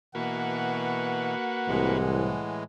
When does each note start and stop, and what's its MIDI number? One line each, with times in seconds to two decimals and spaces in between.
0.15 1.35 47
0.15 1.35 52
0.15 1.98 58
0.15 1.98 66
0.15 1.98 71
0.15 2.58 78
1.67 2.38 36
1.67 2.64 45
1.67 2.64 52
1.67 2.64 56